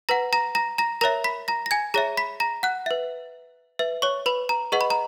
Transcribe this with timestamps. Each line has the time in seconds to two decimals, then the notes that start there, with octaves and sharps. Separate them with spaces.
0.09 B4 F#5 A#5 A#6
0.33 A#5 A#6
0.55 A#5 A#6
0.78 A#5 A#6
1.01 A#4 C#5 E5 A#5 A#6
1.24 B5 B6
1.48 A#5 A#6
1.66 A#6
1.71 G#5 G#6
1.94 G#4 C#5 E5 A#5 A#6
2.17 B5 B6
2.40 A#5 A#6
2.63 F#5 F#6
2.86 B4 E5
3.79 B4 E5
4.02 C#5 C#6
4.26 B4 B5
4.49 A#5
4.72 G#4 B4 D#5 F#5 C#6
4.81 B5
4.90 A#5